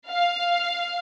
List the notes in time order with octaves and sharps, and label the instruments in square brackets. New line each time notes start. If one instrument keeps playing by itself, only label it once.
[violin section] F5